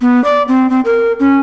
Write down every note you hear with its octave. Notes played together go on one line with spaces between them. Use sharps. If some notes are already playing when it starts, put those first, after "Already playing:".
B3
D5
C4
C4
A#4
C#4